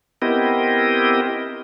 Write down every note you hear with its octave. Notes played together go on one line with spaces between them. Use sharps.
B3 C4 E4 G4 A#4 D#5